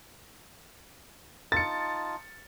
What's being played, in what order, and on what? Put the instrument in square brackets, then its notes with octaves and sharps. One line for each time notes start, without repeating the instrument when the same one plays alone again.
[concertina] D#4 F4 A5 [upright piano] A6 C#7